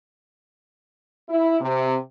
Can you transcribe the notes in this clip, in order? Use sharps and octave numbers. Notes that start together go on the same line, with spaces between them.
E4
C3